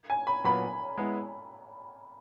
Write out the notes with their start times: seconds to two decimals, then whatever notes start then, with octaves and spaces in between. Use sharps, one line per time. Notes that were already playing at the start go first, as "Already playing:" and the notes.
0.10 G#5
0.27 B5
0.44 A#2 F#3 B3 B5
0.97 G#3 B3 E4